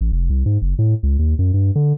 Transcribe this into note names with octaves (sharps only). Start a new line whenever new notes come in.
A1
F1
C2
G#2
F#1
A2
C#2
D#2
F#2
G2
D3